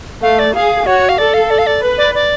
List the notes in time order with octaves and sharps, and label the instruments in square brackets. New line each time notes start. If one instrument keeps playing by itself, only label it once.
[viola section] A3 [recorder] F5
[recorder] D5
[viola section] G#4 [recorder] F5
[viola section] F#4 [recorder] C#5
[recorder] F5
[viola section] A4 [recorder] D5
[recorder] F5
D5
F5
D5
[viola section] B4
[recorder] D5
D5